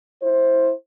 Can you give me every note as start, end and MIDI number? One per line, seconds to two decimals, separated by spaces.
0.23 0.72 64
0.23 0.72 72